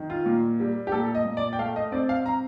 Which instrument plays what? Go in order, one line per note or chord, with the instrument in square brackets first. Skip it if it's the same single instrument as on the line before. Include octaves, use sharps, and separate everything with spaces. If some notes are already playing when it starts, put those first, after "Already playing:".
Already playing: [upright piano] D#3
F4
A#2
G3
G4
A#2 A4
D#5
A#2
D5
G5
A3 F5
D#5
C4 D5
F5
C4 A#5